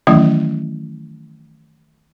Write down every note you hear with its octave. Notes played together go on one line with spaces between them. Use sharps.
D#3 E3 F#3 A3 C#4 E4